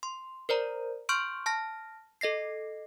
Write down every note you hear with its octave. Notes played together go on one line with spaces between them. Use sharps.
C6
A#4 C5 D5 A#5
C6 C#6 F6 G6 D7
A5 F6 A#6
A4 D#5 A#6 C7